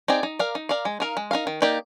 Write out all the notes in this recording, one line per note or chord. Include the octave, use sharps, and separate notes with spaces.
C4 D#4 G#4 D5
D#4
A#4 D5 F5
D#4
A#4 D5 F5
G#3
D#4 A#4 F5
G#3
D#4 A#4 F5
D#3
A#3 D#4 G4 D5